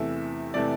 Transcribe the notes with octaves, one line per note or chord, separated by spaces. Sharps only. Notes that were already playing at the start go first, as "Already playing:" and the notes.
Already playing: E2 C3 E3 A3 E5
C3 E3 A3 D5